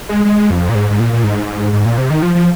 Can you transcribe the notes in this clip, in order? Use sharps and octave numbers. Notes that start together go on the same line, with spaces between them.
G#3
G#3
F2
A#2
G#2
G#2
A#2
A#2
G#2
G#2
A#2
C3
D#3
F3
F3